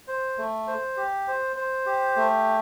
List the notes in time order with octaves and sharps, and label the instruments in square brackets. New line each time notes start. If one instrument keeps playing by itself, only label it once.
[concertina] C5
A3
C5
G4
C5
C5
G4
A3